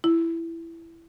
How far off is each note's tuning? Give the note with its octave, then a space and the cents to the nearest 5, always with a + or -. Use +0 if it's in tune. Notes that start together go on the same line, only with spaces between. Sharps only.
E4 +10